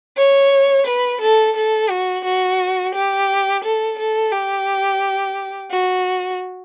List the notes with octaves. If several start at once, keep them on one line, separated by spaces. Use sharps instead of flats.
C#5
B4
A4
A4
F#4
F#4
G4
A4
A4
G4
F#4